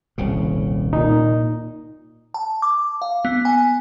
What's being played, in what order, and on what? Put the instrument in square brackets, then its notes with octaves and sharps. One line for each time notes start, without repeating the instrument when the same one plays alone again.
[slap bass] D#1 C2 C#3
[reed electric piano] A#2 D#4
[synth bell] A5
D6
F5
B3
G#5